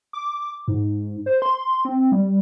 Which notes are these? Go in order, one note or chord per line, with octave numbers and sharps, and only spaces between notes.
D6
G#2
C5
C6
C4
G3